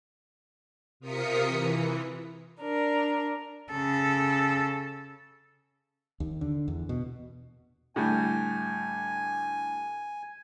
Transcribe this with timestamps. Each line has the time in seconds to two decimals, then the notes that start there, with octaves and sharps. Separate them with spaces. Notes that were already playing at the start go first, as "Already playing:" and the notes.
1.00 C3 F4 A#4 D#6 B6 C#7
1.46 E3
2.61 D4 A#4
3.71 C#3 A4
6.20 D#2
6.41 D3
6.68 E2
6.89 B2
7.96 A2 D3 G3 G#5